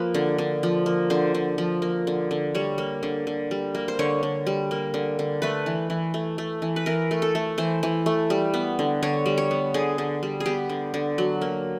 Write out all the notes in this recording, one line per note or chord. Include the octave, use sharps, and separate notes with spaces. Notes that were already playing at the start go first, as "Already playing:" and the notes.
Already playing: F3 A#3 B4
D3
D3
F3
A#3
D3 C5
D3
F3
A#3
D3
D3
G3 C#5
A#3
D3
D3
G3
A#3
C5
D3 C#5
D3
G3
A#3
D3
D3
A3 B4
E3
E3
A3
A3
E3
B4
E3 A#4
A3
A4
A3
E3 C5
E3
A3
G3
B3
D3
D3 C#5
G3
C#5
B3
D3 G#4
D3
G3
G#4
B3 G4
D3
D3
F#3
A#3